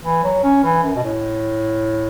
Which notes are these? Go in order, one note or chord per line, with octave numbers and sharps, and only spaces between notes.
E3
F#3
C#4
E3
F#2
B2
A2